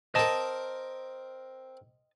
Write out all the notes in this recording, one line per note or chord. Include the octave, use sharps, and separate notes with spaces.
C4 A#4 D#5 A5